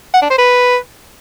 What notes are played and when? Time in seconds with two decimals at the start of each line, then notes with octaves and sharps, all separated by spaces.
0.14 F#5
0.22 D4
0.30 C5
0.38 B4